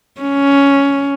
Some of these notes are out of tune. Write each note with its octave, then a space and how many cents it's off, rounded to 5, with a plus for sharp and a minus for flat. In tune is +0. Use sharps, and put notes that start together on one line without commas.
C#4 +10